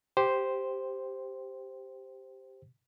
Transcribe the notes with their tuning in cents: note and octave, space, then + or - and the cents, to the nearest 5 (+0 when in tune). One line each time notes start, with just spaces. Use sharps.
G4 +0 C5 +0 G5 +0